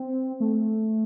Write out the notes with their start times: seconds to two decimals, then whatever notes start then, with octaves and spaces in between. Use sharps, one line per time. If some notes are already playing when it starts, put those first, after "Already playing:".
Already playing: C4
0.40 A3